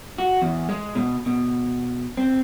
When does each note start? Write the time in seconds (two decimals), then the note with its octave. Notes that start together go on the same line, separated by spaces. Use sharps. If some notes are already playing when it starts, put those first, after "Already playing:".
0.18 F#4
0.42 E2
0.69 G#3
0.95 B2
1.26 B2
2.17 C4